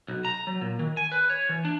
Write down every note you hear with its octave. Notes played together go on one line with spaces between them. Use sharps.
B1
A#5
F#3
A#2
D#3
G#5
B4
C#5
E3
D4